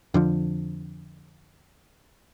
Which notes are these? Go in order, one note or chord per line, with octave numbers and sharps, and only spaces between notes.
F2 D3 F3